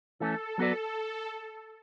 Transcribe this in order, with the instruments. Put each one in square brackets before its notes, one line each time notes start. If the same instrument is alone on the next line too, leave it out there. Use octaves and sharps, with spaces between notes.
[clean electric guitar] E3 A3 C#4 [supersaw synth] A4
[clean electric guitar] F#3 B3 F#4 B4 D5 [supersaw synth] A4